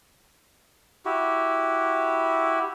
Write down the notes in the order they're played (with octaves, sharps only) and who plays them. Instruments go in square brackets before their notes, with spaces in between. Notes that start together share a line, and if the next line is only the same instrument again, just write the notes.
[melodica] E4 F#4 G4